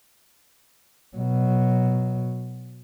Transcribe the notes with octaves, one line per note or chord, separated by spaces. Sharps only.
B2 F#3